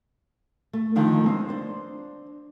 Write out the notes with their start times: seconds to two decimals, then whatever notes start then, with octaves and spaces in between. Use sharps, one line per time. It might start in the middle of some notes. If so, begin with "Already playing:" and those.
0.73 A3
0.96 D3 D#3 F3 A3 D#4
1.24 G#3 C4 C#4
1.49 D4 C5